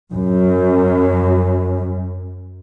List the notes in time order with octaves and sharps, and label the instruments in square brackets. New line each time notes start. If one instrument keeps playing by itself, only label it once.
[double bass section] F#2